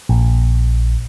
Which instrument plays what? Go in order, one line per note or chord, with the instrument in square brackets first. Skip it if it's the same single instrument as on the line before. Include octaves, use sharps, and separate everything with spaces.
[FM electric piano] A#1